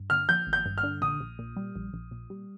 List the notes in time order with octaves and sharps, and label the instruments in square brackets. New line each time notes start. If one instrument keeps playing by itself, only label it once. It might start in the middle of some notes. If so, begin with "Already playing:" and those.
Already playing: [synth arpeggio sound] G2
[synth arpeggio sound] D3 [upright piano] F6
[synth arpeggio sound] F3 [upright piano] G6
[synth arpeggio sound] G#1
[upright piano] G6
[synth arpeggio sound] G2
[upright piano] F6
[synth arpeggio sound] D3
[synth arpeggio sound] A#1 [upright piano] D#6
[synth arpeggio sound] A#1
A#2
G3
A#1
A#1
A#2
G3